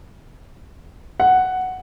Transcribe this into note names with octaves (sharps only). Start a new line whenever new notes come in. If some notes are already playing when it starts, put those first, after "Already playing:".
F#5